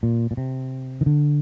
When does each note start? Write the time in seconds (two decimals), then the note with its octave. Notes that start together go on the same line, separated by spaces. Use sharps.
0.03 A#2
0.31 A#2
0.37 C3
1.01 D#3
1.06 D3